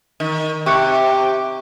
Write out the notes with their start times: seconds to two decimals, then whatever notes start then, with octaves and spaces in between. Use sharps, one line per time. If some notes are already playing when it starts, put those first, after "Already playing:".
0.20 D#3
0.66 C3 G4 C#6 F#6 C#7